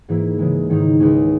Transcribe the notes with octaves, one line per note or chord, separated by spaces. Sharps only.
G#2 E3 A#3 E4
C#3 E3 G#3
G#2 D#3 A#3 D#4
C#2 C#3 G#3 C#4